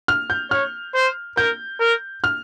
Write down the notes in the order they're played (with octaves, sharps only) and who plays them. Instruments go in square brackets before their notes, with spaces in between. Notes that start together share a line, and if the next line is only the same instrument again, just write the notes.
[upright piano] F6
G6
[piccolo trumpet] C#5 [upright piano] F6
[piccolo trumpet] C5
[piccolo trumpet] A#4 [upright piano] G6
[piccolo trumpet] A#4
[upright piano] F6